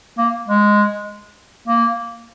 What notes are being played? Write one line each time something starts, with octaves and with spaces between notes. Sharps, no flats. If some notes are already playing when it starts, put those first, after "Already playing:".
A#3
G#3
A#3